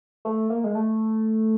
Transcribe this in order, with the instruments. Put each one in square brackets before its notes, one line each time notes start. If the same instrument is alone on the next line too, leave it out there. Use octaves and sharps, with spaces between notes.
[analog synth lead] A3
A#3
G#3
A3